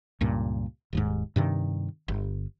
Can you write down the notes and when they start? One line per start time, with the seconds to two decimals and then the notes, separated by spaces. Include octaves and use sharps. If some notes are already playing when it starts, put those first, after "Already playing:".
0.21 C#2 G2 A#2
0.93 D#1 D#2 G#2
1.36 G2 C3 D#3
2.08 G1